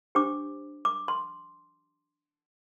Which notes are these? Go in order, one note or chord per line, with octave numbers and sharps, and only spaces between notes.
D4 G4 C5 D6
D6
C6